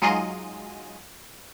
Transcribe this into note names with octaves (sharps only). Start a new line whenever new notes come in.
F#3 G#3 D#4 F4 G#4 D#5